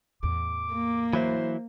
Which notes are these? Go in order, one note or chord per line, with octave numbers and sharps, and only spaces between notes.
E2 A2 D6
A#3
E3 F#3 E4 C5